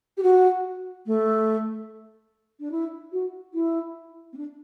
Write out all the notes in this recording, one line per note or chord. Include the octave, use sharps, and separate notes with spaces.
G4
F#4
A3
D4
E4
F#4
E4
C4
D4